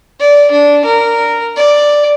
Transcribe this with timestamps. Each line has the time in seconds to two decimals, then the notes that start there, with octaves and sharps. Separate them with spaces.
0.20 D5
0.52 D4
0.85 A#4
1.56 D5